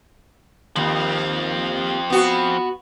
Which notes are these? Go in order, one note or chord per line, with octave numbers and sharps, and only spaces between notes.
D#2 F3 C4
B3 F#4